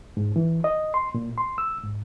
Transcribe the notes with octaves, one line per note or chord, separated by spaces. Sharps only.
G#2
E3
D#5
C6
A#2
C6
E6
G#2